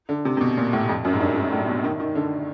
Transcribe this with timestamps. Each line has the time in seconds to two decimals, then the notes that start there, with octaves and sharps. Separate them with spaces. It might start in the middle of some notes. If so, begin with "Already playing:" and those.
0.09 D3
0.25 C3
0.37 C3
0.41 B2
0.57 A#2
0.73 A2
0.89 F2
1.05 F#2
1.13 G#2
1.20 G2
1.36 G#2
1.52 A2
1.68 B2
1.84 D#3
2.00 D#3
2.15 D3